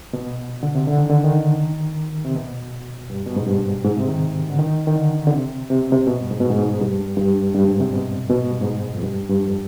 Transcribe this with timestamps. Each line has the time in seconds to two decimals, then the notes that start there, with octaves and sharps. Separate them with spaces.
0.13 B2
0.63 D3
0.75 C3
0.87 D3
0.98 D#3
1.09 D3
1.24 D#3
2.25 C3
2.35 B2
3.10 G2
3.26 B2
3.36 G#2
3.47 G2
3.84 G#2
3.97 C3
4.09 D#3
4.48 D3
4.59 D#3
4.87 D#3
4.95 D3
5.27 D3
5.32 C3
5.70 C3
5.82 B2
5.92 C3
6.07 B2
6.19 G2
6.31 G#2
6.40 B2
6.50 G#2
6.81 G2
7.17 G2
7.55 G2
7.68 G#2
7.80 C3
7.93 B2
8.30 B2
8.40 G#2
8.50 G2
8.61 G#2
8.93 F2
9.03 G2
9.29 G2
9.41 F2